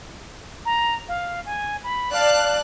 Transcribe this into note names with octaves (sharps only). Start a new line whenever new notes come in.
A#5
F5
G#5
B5
D5 F5 A5 F#6